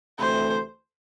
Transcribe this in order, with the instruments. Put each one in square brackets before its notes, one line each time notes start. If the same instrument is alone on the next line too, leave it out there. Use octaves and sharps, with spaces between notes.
[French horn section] D2 C3 E3 A3 [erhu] C5